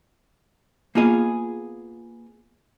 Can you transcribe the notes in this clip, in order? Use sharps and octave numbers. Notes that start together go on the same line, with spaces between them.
A#3 B3 F4 G#4 D#5